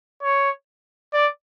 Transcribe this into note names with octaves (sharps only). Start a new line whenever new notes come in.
C#5
D5